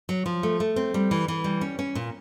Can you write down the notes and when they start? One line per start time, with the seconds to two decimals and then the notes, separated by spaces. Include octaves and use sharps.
0.09 F#3
0.26 F3
0.43 A3
0.60 A3
0.76 C4
0.94 G3
1.11 E3
1.28 E3
1.44 G3
1.61 C#4
1.79 C#4
1.95 A#2